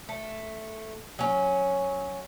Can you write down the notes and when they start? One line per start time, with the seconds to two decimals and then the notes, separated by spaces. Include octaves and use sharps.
0.09 A3
1.19 F#3 C#4